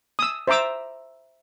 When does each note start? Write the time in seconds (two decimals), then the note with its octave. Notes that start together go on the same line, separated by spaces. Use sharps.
0.19 D#6 E6
0.47 C5 E5 A#5 D6 E6